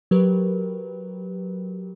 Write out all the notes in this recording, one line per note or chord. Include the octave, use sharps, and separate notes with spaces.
F#3 G4 A#4 B4